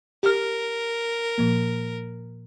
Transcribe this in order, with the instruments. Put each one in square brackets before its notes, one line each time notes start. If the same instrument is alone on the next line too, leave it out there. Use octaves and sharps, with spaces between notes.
[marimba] G4 F6 [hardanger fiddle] A#4
[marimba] A#2 F3 A#3